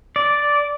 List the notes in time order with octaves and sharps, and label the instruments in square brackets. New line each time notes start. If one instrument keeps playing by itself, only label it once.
[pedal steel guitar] D5